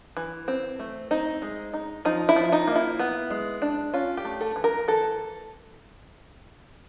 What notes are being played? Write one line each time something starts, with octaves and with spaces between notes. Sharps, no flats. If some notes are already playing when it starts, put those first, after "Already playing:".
E3
C4
A3
C4 D#4
G#3
D#4
F3 D#4
E4
F3
D#4
A#3
E4
B3
G#3
D4
C#4 F4
G4
A3
A4
E3
A#4
E3 A4